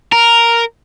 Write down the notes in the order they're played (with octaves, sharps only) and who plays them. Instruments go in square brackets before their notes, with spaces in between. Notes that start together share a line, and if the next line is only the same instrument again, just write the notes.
[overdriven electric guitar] A#4